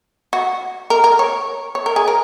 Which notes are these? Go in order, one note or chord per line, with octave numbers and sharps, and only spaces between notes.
F#4
A#4
A#4
C#5
C#5
A#4
G#4
A#4